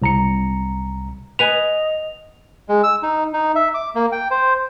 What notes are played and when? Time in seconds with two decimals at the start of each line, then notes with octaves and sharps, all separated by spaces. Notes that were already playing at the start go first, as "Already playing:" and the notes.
0.02 C2 A#5 C#7
1.39 B4 D#5 F#5 G#5 F7
2.69 G#3
2.84 E6
3.03 D#4
3.33 D#4
3.55 E5
3.74 D6
3.95 A#3
4.12 G5
4.31 C5